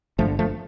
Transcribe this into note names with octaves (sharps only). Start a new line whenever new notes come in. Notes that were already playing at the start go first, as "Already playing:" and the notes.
G1 G2 D3 F3 A3
F3 A3